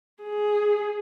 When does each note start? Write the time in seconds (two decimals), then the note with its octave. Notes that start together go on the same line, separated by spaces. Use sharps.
0.23 G#4